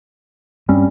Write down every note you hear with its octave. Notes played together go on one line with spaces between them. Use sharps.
G2 G3 C4 C#4